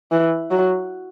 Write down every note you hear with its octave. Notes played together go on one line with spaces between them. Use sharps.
E3
F#3